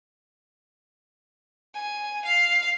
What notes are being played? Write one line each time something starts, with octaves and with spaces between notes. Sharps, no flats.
G#5
F5